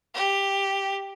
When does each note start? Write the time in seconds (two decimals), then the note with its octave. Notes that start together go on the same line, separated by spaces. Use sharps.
0.14 G4